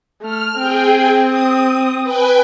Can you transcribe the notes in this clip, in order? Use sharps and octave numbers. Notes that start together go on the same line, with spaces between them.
A3 F6
C4 G#4 G5
D#6
B4 G5 G#5